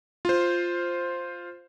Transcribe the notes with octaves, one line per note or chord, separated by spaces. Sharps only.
F4 C5